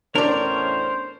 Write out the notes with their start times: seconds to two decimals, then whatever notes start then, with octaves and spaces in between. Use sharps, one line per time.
0.15 E2 A2 C#4 D4 A#4 C5 D5